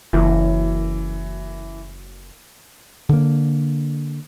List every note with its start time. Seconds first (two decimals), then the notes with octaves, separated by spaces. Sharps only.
0.13 F#1 E3
3.09 D3 A#3